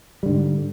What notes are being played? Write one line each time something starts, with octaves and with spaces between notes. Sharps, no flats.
G#2 D3 G3